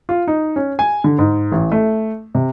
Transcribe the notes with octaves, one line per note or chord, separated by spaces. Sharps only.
F4
D#4
C#4
G#5
D3
G#2
A1
A3
C3